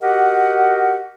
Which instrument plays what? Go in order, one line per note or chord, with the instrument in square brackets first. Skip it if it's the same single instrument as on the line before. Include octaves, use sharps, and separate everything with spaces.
[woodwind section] F#4 G4 A#4 D#5 F#5